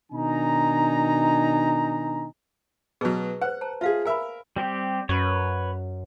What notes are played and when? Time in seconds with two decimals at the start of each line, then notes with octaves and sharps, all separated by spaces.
0.13 B2 D#3 D4 D#4 G#5 A#5
3.01 B2 F#3 G#4 B4
3.41 B4 C5 F#5
3.61 C5 A5 A#5
3.81 F4 G#4 E5 F5
4.05 A#4 E5 G#5 B5
4.56 G3 C4 G4
5.09 F#2 B4 C#5